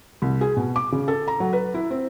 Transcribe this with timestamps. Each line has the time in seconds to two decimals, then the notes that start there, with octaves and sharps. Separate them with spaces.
0.22 C2
0.41 G#4
0.57 B2
0.76 D6
0.92 C#3
1.08 A4
1.28 A#5
1.40 F#3
1.53 B4
1.74 E4
1.91 C4